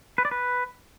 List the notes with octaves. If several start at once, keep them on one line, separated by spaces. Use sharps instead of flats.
B4
D5
B4